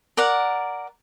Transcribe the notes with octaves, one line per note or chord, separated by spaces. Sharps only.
A#4 D5 F#5